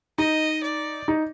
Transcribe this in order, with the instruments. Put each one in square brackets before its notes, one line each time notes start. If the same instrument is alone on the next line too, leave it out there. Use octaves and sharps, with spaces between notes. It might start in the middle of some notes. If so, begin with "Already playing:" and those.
[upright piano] D#4 [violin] D#5
[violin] D5
[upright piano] D#4